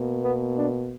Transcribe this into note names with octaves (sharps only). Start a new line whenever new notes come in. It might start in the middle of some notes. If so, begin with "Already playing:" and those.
Already playing: B2 A#3
B3
D4